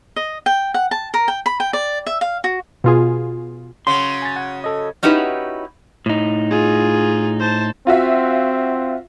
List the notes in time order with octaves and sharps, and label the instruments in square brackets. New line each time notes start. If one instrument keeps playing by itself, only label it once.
[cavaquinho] D#5
G5
F#5
A5
A#4
G5
B5
G5
D5
E5
F5
F#4
[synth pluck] B2 F4 G#4
[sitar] C#3 F#3 [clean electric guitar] C6
[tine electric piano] G#5 A6
F#5
A4 D#5
[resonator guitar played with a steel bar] C#4 D#4 E4 F#4 G4 B4
[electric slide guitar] A2 D#4
[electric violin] F4 G#4
C5 A5
[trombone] C4 [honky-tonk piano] F4 F#4 E5